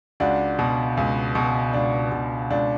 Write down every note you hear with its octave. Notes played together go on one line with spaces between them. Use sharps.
C#2 D4 F#4
B2
C#2
B2
C#2 D4
B2
C#2 D4